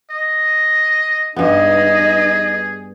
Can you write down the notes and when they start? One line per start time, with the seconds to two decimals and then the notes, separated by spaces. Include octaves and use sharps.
0.11 D#5
1.36 G2 B3 D#4 G#4 D#5